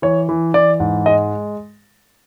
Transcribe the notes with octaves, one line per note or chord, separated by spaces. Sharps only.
E3 C#5
E3
E3 D5
G#2
G#3 D#5